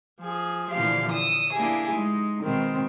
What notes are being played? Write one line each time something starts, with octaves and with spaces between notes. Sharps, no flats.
F3 G#4
A#2 D3 E3 F3 G4 F5
D#6 E6
A#3 D4 E4 G4 G#4
G#3 D#4
B2 D#3 G#3 C4